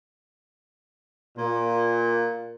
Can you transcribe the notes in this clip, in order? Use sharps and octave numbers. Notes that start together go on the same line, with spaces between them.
A#2